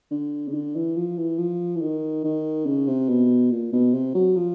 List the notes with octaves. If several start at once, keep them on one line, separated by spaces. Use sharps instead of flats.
D3
C#3
D3
E3
F3
E3
F3
E3
D#3
D#3
C#3
C3
B2
A#2
B2
C3
F#3
F3